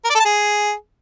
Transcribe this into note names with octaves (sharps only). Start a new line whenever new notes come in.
A#4
D5
A4
A5
G#4